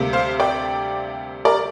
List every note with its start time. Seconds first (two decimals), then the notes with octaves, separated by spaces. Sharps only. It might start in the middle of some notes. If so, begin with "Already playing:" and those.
Already playing: D2 C3 G3 A#3
0.13 C5 F5
0.40 D5 G5
1.45 A#4 D5